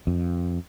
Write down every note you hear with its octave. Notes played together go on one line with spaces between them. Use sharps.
F2